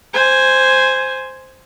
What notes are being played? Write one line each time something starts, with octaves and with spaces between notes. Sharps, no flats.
C5 G#5